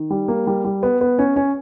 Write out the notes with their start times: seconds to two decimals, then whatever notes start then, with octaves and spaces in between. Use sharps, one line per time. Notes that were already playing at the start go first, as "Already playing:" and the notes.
Already playing: D#3
0.10 G3
0.28 A#3
0.47 G3
0.65 G3
0.83 B3
1.01 B3
1.19 C#4
1.36 C#4